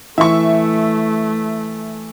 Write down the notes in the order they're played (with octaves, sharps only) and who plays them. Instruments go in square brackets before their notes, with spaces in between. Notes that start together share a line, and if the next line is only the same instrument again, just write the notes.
[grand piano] E3 [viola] A3 [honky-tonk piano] E5 C#6